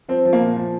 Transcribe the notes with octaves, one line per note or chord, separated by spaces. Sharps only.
F3 C4
F3
A#3
A#2
F3